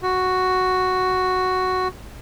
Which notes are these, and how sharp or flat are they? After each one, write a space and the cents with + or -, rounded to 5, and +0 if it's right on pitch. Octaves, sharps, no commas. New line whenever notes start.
F#4 +0